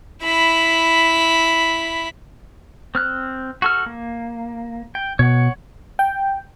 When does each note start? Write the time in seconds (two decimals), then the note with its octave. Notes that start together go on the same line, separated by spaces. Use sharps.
0.23 E4 B5
2.95 C4 F6 F#6
3.62 F#4 A4 F6
3.86 A#3
4.95 G5
5.19 B2 C#5 F#5
5.99 G5